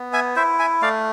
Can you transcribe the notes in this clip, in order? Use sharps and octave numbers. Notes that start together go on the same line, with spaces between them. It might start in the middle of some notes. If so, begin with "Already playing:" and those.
Already playing: B3
E5 G#5
E4 C5 E5
E5 G#5
A3 D5 F5